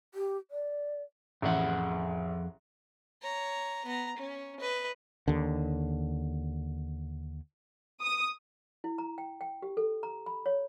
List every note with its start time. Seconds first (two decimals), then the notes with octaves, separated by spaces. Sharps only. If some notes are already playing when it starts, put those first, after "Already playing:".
0.14 G4
0.51 D5
1.42 A1 F2 G#4 F#5
3.22 C#5 A#5
3.85 B3 A#5
4.16 C#4
4.60 B4 D#5
5.28 D#2 D3
8.01 D#6
8.84 E4
8.98 A#5
9.18 G5
9.41 G5
9.62 G4
9.77 A4
10.03 A#5
10.26 B5
10.46 C#5